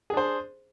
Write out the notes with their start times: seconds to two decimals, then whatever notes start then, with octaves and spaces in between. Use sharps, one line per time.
0.10 G#4
0.14 D4
0.17 C5